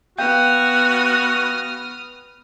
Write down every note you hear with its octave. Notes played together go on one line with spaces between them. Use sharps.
B3 F#4 F5 G5 D#6 F6 G6